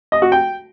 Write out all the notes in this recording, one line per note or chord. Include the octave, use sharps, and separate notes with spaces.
D#5
F#4
G5